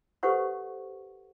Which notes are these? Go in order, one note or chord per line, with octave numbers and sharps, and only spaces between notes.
G4 A4 B4 C5 F#5 C#6